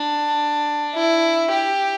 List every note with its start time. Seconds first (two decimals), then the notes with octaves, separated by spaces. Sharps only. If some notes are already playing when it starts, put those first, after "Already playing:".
Already playing: D4
0.95 E4
1.51 G4